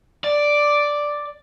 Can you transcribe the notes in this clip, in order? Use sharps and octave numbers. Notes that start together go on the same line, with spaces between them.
D5